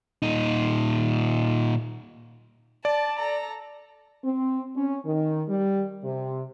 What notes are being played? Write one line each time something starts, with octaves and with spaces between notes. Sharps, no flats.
A#2 D#4
D5 A5
A4 A#5
C4
C#4
D#3
G3
C3